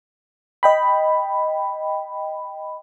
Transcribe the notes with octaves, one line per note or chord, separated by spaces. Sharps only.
D#5 G5 B5